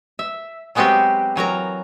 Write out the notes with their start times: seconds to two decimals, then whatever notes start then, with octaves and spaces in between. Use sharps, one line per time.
0.19 E5
0.75 F#3 G#3 B3 C4 F#4 G4
1.36 E3 F#3 A#4 A#5